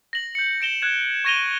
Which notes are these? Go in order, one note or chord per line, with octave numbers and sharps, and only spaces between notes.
A#6 F#7
G6 C#7
A#6 D7 E7 G7
F#6 G#6 E7
C#6 G#6 A#6 D#7 F7 G7